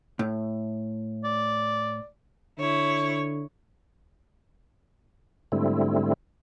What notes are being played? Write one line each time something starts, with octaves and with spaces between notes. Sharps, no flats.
A2
D5
D3 E4 C#5
G#2 D3 G3 A3 C4 E4